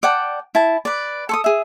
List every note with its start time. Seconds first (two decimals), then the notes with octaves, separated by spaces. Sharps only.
0.03 D5 F#5 G5 A5
0.55 E4 A5
0.85 B4 D5
1.29 A4 C#6 D#6
1.44 G#4 E5